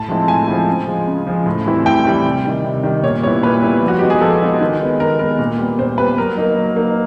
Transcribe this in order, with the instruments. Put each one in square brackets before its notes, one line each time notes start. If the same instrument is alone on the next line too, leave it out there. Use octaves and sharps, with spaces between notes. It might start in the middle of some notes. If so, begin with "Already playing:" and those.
Already playing: [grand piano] A2 [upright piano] A5
[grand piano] F3 G#3 C4 E4
[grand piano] A2 [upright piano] G#5
[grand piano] F3 G#3 C4 E4
C#3
F3 G#3
C#3
F3 G#3
A2
E3 G3 C4 E4
[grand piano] A2 [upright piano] G5
[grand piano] E3 G3 C4 E4
C3
D#3 G3
C3
D#3 G3
[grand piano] A#2 [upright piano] C#5
[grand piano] G3 B3 E4 [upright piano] C#5
[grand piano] A#2 [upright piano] B4
[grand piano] G3 B3 E4
F3
[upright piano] F#4
[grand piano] G#3 B3 D#4 [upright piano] G4
[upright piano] G#4
[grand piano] F3 [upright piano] A4
[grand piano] G#3 B3 D#4
D#3
G#3 B3
[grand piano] D#3 [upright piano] A#4
[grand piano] G#3 B3 [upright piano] A#4
[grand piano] A#2
G3 B3
[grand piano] A#2 [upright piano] C5
[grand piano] G3 B3 [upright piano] B4
[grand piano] F#3 [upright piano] A#4
[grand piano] A#3 D#4
F#3
A#3 D#4